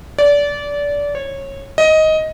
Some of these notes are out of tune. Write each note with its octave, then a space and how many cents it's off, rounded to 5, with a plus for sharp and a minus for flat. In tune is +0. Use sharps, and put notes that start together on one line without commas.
D5 -25
C#5 -20
D#5 +10